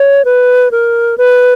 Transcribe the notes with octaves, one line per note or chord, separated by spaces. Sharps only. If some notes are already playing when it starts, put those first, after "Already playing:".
Already playing: C#5
B4
A#4
B4